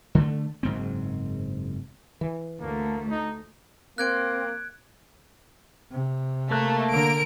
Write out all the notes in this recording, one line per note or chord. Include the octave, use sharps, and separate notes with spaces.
D3 A3
F#1 G#2 C4
E3
D2 A3 A#3
D#4
A#3 C4 F#6 G#6 D7
C3
A3 A#3 F#6
D3 A#4 D7